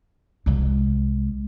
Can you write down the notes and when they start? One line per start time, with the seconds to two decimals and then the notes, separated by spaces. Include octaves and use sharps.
0.46 C2 G#3